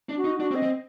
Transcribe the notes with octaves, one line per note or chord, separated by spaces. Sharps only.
D4
F#4
D#4
D4 F#4
C4
D#5
C4